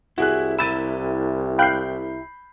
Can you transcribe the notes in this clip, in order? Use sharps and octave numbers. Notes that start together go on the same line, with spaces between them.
C2 E4 F#4 G#4 F#6
E4 G4 A#4 B5 E6 A6 D#7
F5 G5 B5 F#6 G6 C7